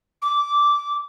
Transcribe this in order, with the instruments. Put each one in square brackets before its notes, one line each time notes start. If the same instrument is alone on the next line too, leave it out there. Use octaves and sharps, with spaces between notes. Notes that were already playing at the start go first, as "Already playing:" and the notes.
[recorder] D6